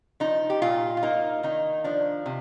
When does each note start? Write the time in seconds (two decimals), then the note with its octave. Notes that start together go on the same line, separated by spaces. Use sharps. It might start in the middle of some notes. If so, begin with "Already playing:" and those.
0.20 F3 D#4
0.50 G4
0.62 A#2 F4
0.97 F4
1.03 A#3 D#4
1.43 D#3 D#4
1.84 F3 D4
2.26 C3